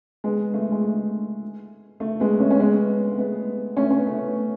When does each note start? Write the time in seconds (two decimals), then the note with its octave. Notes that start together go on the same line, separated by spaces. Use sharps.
0.24 G#3 B3
0.54 A3
0.72 G#3
0.83 A3
2.00 A3
2.20 G#3 B3
2.40 A3 C#4
2.50 C#4
2.60 G#3 B3
3.12 A3
3.18 G#3 B3
3.77 A3 C#4
3.90 C#4
3.98 B3
4.07 A3